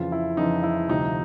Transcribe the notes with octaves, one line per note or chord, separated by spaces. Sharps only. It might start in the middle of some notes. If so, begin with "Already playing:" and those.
Already playing: F2 C#3 E3 F4
E4
F2 C#3 E3 D#4
E4
D2 C3 F3 D#4